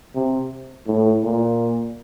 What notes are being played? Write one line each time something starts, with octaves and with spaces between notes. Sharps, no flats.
C3
A2
A#2